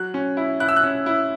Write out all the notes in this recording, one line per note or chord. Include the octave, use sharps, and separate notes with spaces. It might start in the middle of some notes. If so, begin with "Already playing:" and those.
Already playing: F#3 F#6
C#4
E4
E4 F#6
E6
F#6
C#4
E4